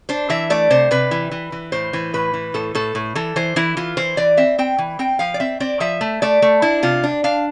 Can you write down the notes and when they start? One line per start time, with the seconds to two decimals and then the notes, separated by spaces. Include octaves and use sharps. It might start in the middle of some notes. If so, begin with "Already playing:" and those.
0.09 D4 C5
0.30 E3 E5
0.50 A3 D5
0.70 C3 C5
0.91 C3 B4
1.11 E3
1.31 E3
1.52 E3
1.72 A2 C5
1.93 E3
2.14 A2 B4
2.34 E3
2.54 A2 A4
2.75 A2 A4
2.95 A2
3.15 E3 A4
3.36 E3 C5
3.56 E3 E4
3.77 E3 F4
3.97 E3 C5
4.17 E3 D5
4.37 C4 E5
4.58 C4 G5
4.78 E3
4.99 C4 G5
5.19 F3 F5
5.34 D5
5.40 C4 E5
5.60 C4 D5
5.80 F3 E5
6.01 A3
6.22 A3 D5
6.42 A3
6.62 D4 E4
6.83 C3 F4
7.03 D4
7.24 D4 F5